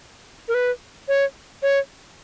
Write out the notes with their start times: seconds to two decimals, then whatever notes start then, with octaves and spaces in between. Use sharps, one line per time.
0.48 A#4
0.54 B4
1.08 C#5
1.62 C#5